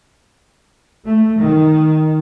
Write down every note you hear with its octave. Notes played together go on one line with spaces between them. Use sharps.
A3
D#3